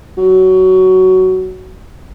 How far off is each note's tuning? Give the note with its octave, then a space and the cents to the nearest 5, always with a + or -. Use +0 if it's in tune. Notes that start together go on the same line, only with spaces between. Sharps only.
F#3 +15